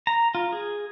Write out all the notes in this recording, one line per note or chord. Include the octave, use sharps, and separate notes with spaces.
A#5
F4
G#4